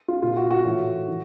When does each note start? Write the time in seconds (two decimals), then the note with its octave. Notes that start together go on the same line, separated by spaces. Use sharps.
0.08 F4
0.22 A#2 F4
0.37 F#4
0.51 F#4
0.64 A2 E3
1.08 E3